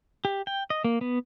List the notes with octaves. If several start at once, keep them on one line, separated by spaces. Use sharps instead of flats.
G4
G5
D#5
A#3
B3